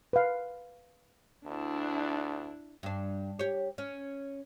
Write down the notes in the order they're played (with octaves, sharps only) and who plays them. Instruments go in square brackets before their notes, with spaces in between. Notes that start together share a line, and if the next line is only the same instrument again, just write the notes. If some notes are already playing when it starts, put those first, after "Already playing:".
[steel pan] B4 F5
[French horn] D2 [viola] D4 E4
[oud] G2 D4
G4 C#5
C#4